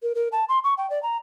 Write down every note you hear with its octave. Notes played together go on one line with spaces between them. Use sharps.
A#4
A#4
A5
C6
C#6
G5
D5
A#5